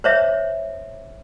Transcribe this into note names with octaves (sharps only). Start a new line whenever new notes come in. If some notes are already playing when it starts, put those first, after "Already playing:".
C5 C#5 E5